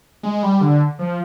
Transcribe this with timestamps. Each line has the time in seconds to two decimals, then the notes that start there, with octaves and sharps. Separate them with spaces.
0.23 G#3
0.43 G3
0.61 D3
0.99 F3